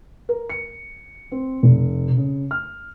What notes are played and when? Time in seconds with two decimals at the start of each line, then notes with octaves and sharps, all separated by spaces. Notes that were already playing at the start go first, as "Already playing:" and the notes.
0.29 A#4
0.50 C#7
1.32 C4
1.63 F1
2.17 C#3
2.51 F6